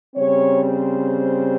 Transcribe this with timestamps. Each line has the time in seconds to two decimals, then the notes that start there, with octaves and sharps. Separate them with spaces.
0.16 C#3 G3 C4 C#5
0.62 C5